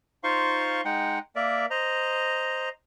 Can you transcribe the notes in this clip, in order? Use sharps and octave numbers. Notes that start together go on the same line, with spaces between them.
D#4 F4 C5 F5 C6 C#6
G#3 D#4 F#5 G5
A#3 A#4 D5 E5
C5 D#5 A#5